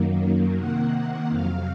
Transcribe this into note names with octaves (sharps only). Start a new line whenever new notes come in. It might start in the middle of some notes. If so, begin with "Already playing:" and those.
Already playing: F#2 D#3 F#3 A#3
C3 D#3 A#3 F#5
F2 C3 F#3 F5